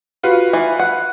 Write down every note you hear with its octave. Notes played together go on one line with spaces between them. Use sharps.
F4 F#4 B4
E3
F#5